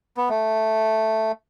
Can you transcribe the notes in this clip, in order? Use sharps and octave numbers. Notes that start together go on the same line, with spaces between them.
B3
A3